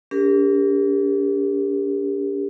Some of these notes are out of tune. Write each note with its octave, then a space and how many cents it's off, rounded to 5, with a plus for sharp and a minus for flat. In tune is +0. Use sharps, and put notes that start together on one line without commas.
D4 -45 G4 +30 A#4 -10